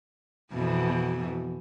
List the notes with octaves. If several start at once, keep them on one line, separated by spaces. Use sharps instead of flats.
F2 B2 E3